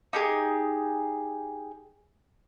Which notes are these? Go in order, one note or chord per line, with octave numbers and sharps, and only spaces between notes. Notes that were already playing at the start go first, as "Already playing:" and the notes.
D#4 G4 G#4